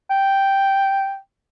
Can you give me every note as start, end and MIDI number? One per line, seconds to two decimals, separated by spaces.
0.10 1.17 79